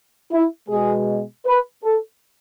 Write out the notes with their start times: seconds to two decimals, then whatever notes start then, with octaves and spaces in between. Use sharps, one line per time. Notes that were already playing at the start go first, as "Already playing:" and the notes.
0.31 E4
0.69 B2 G#3 G#4
1.46 B4
1.84 A4